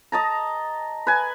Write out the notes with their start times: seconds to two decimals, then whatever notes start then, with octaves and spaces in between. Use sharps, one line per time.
0.12 D#5 A5 A#5
1.07 B4 G#5